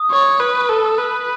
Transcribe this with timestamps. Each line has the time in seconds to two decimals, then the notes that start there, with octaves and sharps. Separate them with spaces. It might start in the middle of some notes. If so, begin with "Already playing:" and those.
Already playing: D#6
0.11 C#5
0.40 B4
0.69 A4
0.98 B4